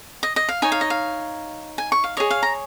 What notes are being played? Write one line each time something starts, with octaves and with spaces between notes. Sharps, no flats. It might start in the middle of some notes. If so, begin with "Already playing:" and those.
D#5
D#5
F5
D#4 C#5 G#5
F5
D#5
F5
G#5
C#6
F5
G#4 C#5 D#5
F5
A#5